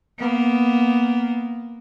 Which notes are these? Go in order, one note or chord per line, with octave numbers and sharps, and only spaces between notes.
A#3 B3